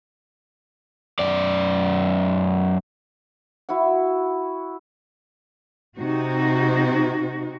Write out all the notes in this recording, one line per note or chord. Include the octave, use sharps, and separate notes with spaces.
F#2 D5
E4 F#4 F#5
C3 C4 D#4 F#4